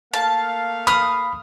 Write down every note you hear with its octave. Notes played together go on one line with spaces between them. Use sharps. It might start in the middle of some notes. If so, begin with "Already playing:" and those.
A3 A#3 F5 A5
B5 D#6 F6